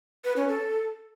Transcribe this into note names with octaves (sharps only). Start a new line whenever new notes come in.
B4
C#4
A4